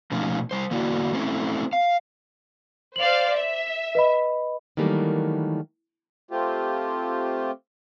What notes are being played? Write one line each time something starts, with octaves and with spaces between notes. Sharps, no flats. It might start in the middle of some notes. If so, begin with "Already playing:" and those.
B2 F3 A3 C#4 D#4
G3 C5
E2 D3 A#3 E4 F#4 D5
A3 C4 C#4 D#4 E4
F5
C5 D5 F5 F7 F#7
E5
B4 D#5 B5
D#3 E3 F#3 G3 A3 A#3
A3 C4 F4 G4